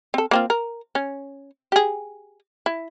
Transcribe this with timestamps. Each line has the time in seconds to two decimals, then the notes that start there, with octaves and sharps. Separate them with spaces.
0.14 C4 A4
0.31 A#3 C4 F4
0.50 A#4
0.95 C#4
1.72 G4 G#4
2.66 E4